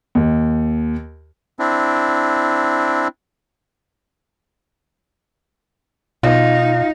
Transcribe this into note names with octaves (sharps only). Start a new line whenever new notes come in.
D#2
C4 D4 E4
B2 D#4 F4